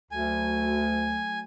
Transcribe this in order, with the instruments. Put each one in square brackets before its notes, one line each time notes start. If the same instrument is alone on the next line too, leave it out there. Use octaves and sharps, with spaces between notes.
[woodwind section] D2 [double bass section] F#3 A3 [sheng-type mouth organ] G#5